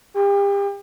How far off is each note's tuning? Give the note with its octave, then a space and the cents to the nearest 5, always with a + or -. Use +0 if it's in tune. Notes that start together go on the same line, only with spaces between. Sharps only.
G4 +35